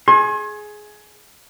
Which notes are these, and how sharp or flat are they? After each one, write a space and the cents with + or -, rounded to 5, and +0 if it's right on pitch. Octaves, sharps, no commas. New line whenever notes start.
G#4 +15 C6 +45